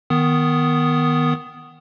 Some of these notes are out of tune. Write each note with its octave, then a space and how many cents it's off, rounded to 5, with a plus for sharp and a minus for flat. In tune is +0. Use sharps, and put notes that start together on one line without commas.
D#3 +0 B3 +0 D#6 +0